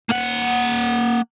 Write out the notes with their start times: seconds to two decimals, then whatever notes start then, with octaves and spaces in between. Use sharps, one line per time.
0.10 A#3 F#5